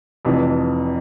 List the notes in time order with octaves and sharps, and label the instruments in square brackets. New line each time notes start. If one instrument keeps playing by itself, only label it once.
[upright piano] F1 F2 E3